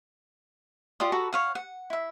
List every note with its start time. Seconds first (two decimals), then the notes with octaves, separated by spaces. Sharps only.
1.00 F4 G4 D5 D#6
1.12 F#4 A4 B4 A#5
1.33 C#5 F5 F#5
1.55 F#5
1.90 E4 E5